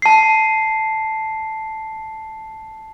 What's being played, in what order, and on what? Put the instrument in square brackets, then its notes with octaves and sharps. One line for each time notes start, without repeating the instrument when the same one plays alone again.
[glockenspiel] A5 C7